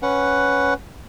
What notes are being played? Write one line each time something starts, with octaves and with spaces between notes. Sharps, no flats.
C#4 B4 F#5